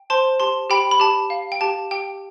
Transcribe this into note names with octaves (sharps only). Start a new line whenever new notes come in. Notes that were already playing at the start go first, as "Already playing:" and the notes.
Already playing: G5
C5 A5 C6
G4 A5 C6
G4 G5 B5
B5
G4 A5
F5
G5
G4 A5
G4 G5